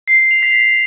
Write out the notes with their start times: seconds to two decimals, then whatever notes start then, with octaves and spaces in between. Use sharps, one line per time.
0.08 C7
0.19 C7
0.31 F7
0.43 B6